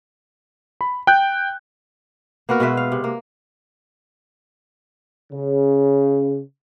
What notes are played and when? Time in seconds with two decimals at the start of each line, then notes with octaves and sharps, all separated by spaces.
0.81 B5
1.07 G5 F#6 G6
2.49 A#3 B3 F#4 A#4
2.60 B2 G#3 B4 E5
2.77 F5
2.92 C3
3.04 A#3
5.33 C#3